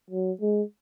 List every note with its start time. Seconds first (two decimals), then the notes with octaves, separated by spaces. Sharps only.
0.10 F#3
0.41 G#3